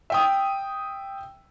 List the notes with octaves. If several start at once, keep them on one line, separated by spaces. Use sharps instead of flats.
E5 G5 D#6